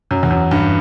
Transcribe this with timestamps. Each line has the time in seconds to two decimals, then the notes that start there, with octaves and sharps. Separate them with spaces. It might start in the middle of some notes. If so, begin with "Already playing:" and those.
0.11 F#2
0.23 E2
0.31 F#2
0.51 G2